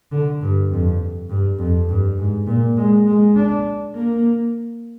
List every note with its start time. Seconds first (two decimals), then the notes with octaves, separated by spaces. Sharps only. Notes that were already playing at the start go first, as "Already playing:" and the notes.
0.12 D3
0.41 G2
0.71 F2
1.29 G2
1.58 F2
1.89 G2
2.18 G#2
2.47 A#2
2.77 G#3
3.06 G#3
3.35 D4
3.95 A#3